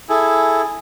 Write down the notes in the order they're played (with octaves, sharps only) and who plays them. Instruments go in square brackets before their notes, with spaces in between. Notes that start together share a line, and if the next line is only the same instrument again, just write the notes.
[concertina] E4 G#4 A4